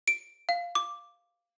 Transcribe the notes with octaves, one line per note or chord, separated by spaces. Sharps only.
D7
F5
D6